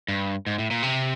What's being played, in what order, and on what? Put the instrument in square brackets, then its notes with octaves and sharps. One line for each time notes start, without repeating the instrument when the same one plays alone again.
[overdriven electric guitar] G2
G#2
A2
A#2
C3